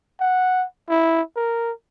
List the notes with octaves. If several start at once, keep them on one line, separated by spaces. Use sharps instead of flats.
F#5
E4
A#4